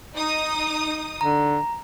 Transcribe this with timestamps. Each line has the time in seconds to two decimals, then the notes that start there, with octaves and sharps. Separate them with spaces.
0.16 D#4 D#6
1.21 D3 A#5